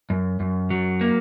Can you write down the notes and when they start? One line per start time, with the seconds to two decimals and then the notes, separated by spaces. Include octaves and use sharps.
0.10 F#2
0.40 F#2
0.70 F#3
1.01 A#3